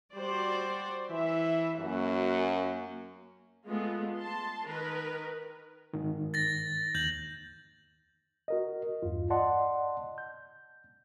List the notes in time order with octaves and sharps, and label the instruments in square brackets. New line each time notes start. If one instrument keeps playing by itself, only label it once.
[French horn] G3 [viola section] F#4 C5 D5
[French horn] E3 [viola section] E5
[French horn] F#2 [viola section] A#3 F#4
[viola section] G#3 A3 B3 F4
A5 C6
D#3 A#4 B4
[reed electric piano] G#2 D#3
[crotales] A6 A#6
[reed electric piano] D#2 [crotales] G6 F#7
[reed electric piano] F#4 A#4 D#5
E2 G2 F4
D5 D#5 F#5 A5 C6
G6